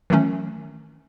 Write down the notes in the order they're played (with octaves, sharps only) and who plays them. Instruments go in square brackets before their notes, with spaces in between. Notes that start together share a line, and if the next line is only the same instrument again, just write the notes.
[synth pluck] D#3 E3 F#3 A3 C#4